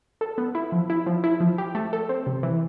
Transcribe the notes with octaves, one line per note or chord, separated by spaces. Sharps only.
A4
B3
E4
F3
E4
F3
E4
F3
G4
A3
A4
C4
C3
E3